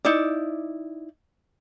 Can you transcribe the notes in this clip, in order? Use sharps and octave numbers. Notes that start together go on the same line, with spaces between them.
D#4 E4 D5